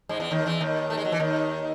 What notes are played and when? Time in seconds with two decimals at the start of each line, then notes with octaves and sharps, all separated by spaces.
0.09 G#2 G#3
0.20 E2 E3
0.31 D#2 D#3
0.46 E2 E3
0.60 D#2 D#3
0.90 A3
0.97 G#3
1.05 F#3
1.12 E3
1.20 D#2 D#3